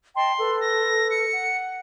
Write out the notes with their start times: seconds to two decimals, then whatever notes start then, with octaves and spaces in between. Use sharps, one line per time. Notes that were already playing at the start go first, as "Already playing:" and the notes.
0.16 D#5 G5 A5 C6
0.39 A4 B4
0.60 A#6
1.10 C#7
1.31 F#5